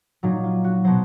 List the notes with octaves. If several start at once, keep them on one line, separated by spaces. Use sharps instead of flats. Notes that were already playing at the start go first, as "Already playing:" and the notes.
A#2 F#3 D#4
F4
F#4
B2 F#3 C5